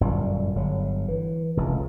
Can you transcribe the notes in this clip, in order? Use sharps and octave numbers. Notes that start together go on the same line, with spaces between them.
G1 F#2 A#2 G3
G1 F#3
E3
F1 C#2